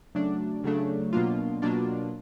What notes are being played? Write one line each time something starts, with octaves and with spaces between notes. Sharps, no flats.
C#3 F#3 A3 D4
C#3 F#3 A3 D4
B2 F#3 A#3 D4 F4
B2 F#3 A#3 D4 F4